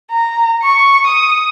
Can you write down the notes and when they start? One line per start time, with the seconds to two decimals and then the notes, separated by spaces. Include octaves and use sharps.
0.11 A#5
0.63 C#6
1.07 D#6